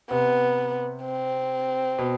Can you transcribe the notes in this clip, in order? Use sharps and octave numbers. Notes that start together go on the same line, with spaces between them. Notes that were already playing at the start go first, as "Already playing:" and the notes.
C3 B3
C4
B2